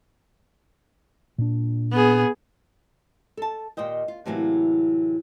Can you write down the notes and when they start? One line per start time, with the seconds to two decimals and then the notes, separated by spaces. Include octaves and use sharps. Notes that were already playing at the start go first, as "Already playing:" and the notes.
1.38 A#2 D4
1.92 B3 G#4
3.37 A4 A5
3.77 D#2 A#2 C5 D#5 G5
4.08 F4
4.26 A2 C3 E3 F#3 A#3